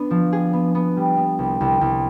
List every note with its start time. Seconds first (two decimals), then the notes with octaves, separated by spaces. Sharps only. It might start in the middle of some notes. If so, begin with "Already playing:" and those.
Already playing: B3 D4
0.11 F3
0.33 G#4
0.53 B3
0.75 B3
0.97 G3
1.17 B3
1.39 C2
1.61 C2
1.81 C2